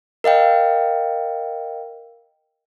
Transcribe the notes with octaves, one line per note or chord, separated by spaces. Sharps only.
A#4 D#5 F5 G5